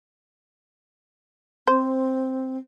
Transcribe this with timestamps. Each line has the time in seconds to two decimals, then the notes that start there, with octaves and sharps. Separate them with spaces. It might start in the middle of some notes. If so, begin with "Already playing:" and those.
1.67 C4 C5